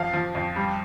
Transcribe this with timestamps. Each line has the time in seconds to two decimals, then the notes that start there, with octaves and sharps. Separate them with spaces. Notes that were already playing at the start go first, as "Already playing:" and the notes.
Already playing: F2 F3 F5
0.13 F3
0.35 F2
0.56 G3